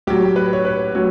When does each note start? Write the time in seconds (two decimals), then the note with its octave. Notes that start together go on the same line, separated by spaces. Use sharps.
0.07 A2 F#3 G4
0.36 B4
0.53 C#5
0.65 B4
0.95 A2 F#3 C#5